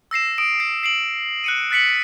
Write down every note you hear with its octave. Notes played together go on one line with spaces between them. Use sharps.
E6 A#6 C7 E7
D#6 D7
C7
C7 D7 F#7
F#6 C#7 D#7
F#6 A6 B6 C#7 F#7